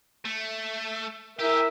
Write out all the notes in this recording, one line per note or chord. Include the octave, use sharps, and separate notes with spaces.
A3
E4 G4 G#4 A#4 E5